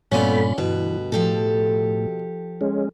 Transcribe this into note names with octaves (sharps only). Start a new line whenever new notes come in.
G2 A#2 A3 B3 C#4 F4 D5 B5
D2 G2 B2 E3 B4
A2 F3 G4 A4
G#3 C#4